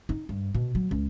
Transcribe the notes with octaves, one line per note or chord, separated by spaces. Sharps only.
D#4
G2
B2
F#3
C#2